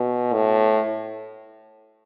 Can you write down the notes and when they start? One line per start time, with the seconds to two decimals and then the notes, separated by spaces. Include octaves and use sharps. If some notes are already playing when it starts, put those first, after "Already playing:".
Already playing: B2
0.33 A2